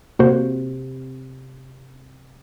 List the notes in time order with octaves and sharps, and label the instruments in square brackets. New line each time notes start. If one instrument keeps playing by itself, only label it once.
[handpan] C3 [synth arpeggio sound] A#3 F#4 C5